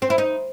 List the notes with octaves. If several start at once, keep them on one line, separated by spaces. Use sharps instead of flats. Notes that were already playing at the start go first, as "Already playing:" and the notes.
C4
E4
D#4